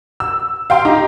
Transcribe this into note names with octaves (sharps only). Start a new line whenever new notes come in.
E6
F5 G5 C6
D#4 G4 A#5